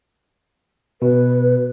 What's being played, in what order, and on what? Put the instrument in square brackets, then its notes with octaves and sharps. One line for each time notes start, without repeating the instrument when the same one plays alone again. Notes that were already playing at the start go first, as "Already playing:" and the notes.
[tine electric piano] B2 [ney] B4